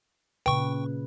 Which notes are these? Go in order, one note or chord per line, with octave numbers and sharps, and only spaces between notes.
A#2 C#3 B4 G5 C#6